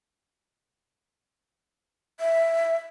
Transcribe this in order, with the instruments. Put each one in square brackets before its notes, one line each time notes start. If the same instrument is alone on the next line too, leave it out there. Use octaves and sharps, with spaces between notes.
[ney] E5